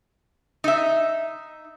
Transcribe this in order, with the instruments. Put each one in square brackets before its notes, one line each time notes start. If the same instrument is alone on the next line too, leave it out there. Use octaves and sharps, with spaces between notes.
[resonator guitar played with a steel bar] D#4 E5